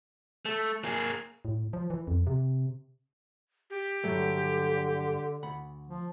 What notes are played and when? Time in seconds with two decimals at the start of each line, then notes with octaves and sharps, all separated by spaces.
0.46 A3
0.85 A#3 G#4
1.45 A2
1.73 F3
1.90 E3
2.07 F2
2.27 C3
3.70 G4
4.04 G2 D3 F#3 A3
5.43 D2 F#5 B5
5.87 F3